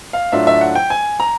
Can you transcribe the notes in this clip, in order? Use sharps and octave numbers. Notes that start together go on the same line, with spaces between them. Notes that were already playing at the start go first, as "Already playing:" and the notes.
F5
A2 F#3 A3 D4 F4 E5
E5
F#5
G5
G#5
A#5